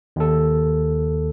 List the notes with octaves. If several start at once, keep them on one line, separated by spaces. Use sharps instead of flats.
D#2 A4